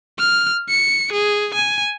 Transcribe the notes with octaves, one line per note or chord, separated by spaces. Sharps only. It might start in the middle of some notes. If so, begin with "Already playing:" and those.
F6
C#7
G#4
G#5